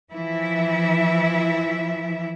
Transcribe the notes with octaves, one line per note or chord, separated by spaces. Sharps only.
E3 F3 E4 E5